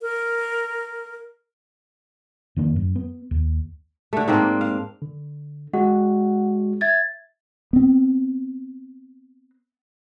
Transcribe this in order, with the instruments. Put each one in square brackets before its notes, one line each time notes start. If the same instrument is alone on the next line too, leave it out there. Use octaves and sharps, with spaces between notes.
[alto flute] A#4
[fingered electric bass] F2 D#3 A#3 D4
F#2
B3
D#2
[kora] D3 A3
G#2 A#3 C4 D4
F5
[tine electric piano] D3
[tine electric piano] G#3 F#4 [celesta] F#5
[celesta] E5 G#6 A6
[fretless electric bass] B3 C4